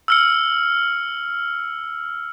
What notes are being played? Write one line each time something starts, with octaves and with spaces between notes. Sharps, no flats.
E6 F6 C#7